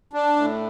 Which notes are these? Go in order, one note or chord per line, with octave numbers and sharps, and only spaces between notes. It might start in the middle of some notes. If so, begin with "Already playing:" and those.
D4
A2